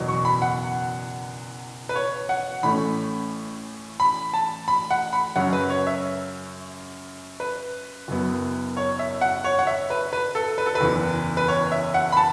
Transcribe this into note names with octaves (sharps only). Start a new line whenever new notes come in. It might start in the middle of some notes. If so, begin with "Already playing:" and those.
Already playing: F#1 E2 B2 F#3
C#6
B5
F#5
B4
C#5
F#5
A1 A2 A3 C#4 B5
B5
A5
B5
F#5
B5
F#2 C#3 F#3 C#4 F#5
B4
C#5
E5
B4
F#1 F#2 F#3 B3
C#5
E5
F#5
C#5
F#5
E5
B4
B4
A4
B4
A4
B4
F#1 E2 E3 B3
B4
C#5
E5
F#5
B5
A5